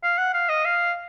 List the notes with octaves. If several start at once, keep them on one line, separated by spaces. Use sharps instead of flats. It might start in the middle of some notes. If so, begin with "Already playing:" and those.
F5
F#5
F5
D#5
F5